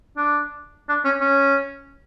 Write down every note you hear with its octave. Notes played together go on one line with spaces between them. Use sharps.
D4
D4
C#4
C#4